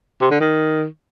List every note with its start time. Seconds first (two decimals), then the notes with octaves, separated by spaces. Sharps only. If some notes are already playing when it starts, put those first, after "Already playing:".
0.21 C3
0.31 D3
0.40 D#3